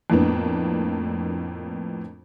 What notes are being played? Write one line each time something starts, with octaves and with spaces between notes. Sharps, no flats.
F2 A2 A#3 B3 D4